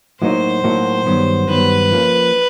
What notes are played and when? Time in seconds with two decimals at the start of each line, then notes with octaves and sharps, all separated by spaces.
0.21 A2 F#3 A#3 D#4 F#4 C5
0.64 A2 F#3 A#3 D#4 F#4
1.06 G2 D#3 F#3 B3
1.49 G2 D#3 F#3 B3 B4
1.92 F3 A#3 C#4